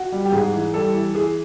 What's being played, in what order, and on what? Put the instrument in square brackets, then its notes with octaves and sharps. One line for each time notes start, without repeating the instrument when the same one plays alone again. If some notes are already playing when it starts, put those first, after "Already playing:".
Already playing: [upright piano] F#4
G3
G4
G#2 G#4
E3
G3 A4
E3
E3 G#4